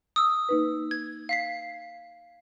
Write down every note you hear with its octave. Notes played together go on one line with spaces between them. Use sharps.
D#6 E6
A#3 D#4 B4
G#6
F5 B6 C7